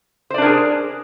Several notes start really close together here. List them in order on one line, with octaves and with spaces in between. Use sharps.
C5 D5 D4 A#4 G#4